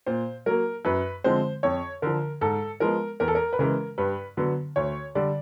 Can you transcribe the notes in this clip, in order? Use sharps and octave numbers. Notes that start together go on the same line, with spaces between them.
A#2 C5
F#3 A#3 A#4
F#2 B4
D3 F3 G#3 C4 C5
F2 C#5
D3 F3 A#4
G#2 A4
F3 G#3 B3 A#4
E2 A#4
A4
A#4
B4
C#3 E3 G#3 A#4
G2 B4
D3 F#3 B3
D2 C#5
D3 G3 D5